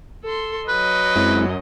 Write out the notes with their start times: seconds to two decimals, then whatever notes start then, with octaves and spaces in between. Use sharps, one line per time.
0.24 A4 C6
0.69 F#3 B4 D#5
1.16 F#2 G#3 C4 E4